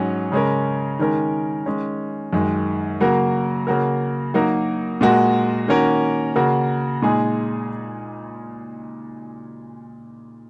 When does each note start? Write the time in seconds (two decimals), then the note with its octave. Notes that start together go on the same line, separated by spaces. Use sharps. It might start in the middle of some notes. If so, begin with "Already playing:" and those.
Already playing: G#2 F#3 C#4 G#4
0.32 C#3 G#3 C#4 A#4
0.99 D#3 G#3 C#4 A#4
1.66 D#3 G#3 C#4
2.33 F#2 D#3 G#3
3.00 C#3 F#3 A#3 F#4 A#4
3.67 C#3 A#3 F#4 A#4
4.34 F#3 A#3 D#4 F#4 A#4
5.01 A#2 G#3 F#4 A#4
5.68 D#3 A#3 C#4 F#4 A#4
6.36 C#3 A#3 F#4 A#4
7.02 A#2 G#3 D#4 G#4